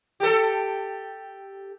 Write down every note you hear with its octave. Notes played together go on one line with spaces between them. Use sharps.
G4 A4